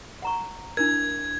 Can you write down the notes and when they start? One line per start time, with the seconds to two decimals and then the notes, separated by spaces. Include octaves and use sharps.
0.22 F#5 A#5 C#6
0.77 D4 E4 A#4 G#6